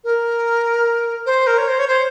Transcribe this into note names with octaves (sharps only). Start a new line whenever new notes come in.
A#4
C5
A#4
C#5
C5
C#5
C5